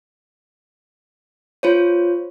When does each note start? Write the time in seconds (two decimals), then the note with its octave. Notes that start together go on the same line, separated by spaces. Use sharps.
1.63 F4 C5 C#5